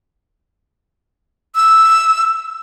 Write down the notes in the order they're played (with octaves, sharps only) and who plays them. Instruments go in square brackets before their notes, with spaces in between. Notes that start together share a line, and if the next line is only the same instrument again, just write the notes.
[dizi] E6